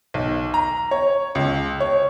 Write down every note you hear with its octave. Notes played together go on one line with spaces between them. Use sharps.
B1
A#5
C#5
C#2
C#5